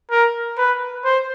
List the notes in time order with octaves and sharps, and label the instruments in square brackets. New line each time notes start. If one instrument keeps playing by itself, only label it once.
[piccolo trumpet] A#4
B4
C5